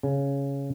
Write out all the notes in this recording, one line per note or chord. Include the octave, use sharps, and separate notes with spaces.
C#3